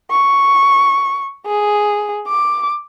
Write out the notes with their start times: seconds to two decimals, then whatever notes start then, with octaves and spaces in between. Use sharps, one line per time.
0.11 C#6
1.46 G#4
2.28 D6